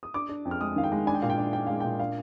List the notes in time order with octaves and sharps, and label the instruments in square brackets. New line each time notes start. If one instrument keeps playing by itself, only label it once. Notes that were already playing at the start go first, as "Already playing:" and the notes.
[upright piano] D#6
D4 D6
D4
F2
F6
G#3 D#6
D#3 F5
G5
G#3
D4 G#5
G5
A#2 F5
G5
D4
D4 G5
G#3 F5
A#2 G5
D4 F5